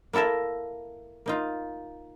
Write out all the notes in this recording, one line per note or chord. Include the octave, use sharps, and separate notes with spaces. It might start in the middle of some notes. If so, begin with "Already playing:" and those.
A#3 E4 A4 A#4 E5
A#3 D#4 F4